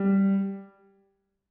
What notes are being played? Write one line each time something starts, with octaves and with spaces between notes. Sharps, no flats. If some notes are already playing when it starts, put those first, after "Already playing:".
Already playing: G3